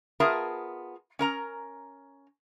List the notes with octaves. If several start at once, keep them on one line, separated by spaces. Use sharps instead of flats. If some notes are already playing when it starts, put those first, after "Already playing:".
B3 F4 G#4 A#4 E5 A5
C#4 A#4 A#5